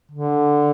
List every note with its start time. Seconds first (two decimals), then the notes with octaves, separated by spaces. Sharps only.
0.12 D3